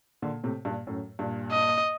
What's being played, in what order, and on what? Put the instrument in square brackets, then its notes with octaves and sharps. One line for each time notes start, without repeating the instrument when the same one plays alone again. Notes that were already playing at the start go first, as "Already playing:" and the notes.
[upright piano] A#2 D3
A2 C3
G2 A#2
F#2 A2
G2 A#2
[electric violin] D#5